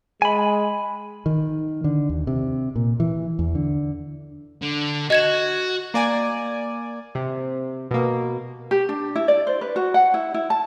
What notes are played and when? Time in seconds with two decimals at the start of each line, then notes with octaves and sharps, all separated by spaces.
0.22 G#3 G#5 B5
1.26 D#3
1.84 D3
2.09 D#2
2.27 C3
2.76 A#2
3.00 E3
3.39 E2
3.55 D3
4.62 D3
5.10 F#4 D#5 G#6 E7
5.94 A#3 D5 G#5
7.15 C3
7.91 B2 A#3
8.71 G4
8.89 D4
9.16 E4
9.28 D5
9.47 C5
9.61 B4
9.76 F#4
9.94 F#5
10.14 E4
10.34 E4
10.50 A5